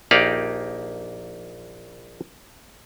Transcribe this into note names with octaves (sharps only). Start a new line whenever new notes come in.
A#1 A#3 D#4 G4 D5 F5